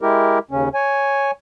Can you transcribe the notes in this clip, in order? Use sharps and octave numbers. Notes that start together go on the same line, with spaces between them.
G#3 E4 G4 A#4
D#2 C#3 C#4
C#5 G#5